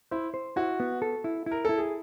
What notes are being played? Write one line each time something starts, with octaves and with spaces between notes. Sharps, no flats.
E4 C5
C5
E4 F#4
B3
A4
E4
E4 A#4
E4 A4
G#4